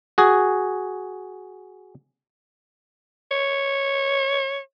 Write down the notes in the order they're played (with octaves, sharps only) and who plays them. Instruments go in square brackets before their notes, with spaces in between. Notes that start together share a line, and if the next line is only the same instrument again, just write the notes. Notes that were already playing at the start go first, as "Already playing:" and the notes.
[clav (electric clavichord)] F#4 G#4
[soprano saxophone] C#5